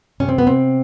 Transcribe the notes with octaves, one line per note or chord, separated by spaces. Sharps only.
C3 C#4
C4
B3
C3 C4